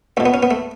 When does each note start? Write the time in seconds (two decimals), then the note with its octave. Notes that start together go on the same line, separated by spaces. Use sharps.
0.17 C#2 B2 A3
0.26 B3
0.34 C#4
0.43 B3
0.51 A3